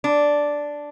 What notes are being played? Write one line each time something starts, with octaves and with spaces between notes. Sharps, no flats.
D4